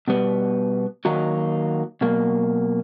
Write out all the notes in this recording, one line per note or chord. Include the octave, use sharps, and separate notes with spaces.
B2 G3 B3
D#3 F#3 A#3 D#4 F#4
B2 F#3 A#3